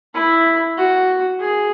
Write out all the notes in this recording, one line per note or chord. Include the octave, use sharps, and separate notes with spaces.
E4
F#4
G#4